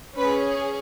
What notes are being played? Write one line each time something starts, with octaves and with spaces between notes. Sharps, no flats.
C#4 G#4 B4